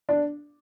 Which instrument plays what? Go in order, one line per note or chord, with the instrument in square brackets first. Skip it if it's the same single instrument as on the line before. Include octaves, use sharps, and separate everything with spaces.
[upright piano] D4